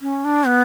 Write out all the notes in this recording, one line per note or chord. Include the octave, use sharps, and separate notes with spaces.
C#4
D4
B3